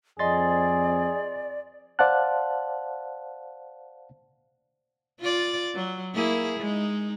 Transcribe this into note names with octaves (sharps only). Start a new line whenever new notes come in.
F2 C4 G#4 D5 D#5 C6 A6
C5 D5 F5 F#5 A5 F#6
F4 D5
F#3
A#3 E4 G#4
G#3 D#4